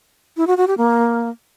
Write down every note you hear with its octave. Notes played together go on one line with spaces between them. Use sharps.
E4
F#4
F#4
G4
A#3